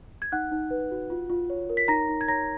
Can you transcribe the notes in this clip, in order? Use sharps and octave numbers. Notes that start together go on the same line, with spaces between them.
G#6
D#4 F#5 F#6
D#4
B4
F#4
F4
F4
C#5
A#4
B6
D#4 A#5 A#6
D#4
G#6
C#5 A#5 A#6